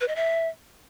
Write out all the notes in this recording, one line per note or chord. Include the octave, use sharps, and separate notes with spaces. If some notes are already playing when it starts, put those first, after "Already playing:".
B4
D#5
E5